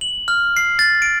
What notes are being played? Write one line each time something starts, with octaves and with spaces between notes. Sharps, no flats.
F#7
F6
C7
A6
D7